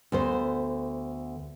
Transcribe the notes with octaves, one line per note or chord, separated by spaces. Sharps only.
D2 B3 C5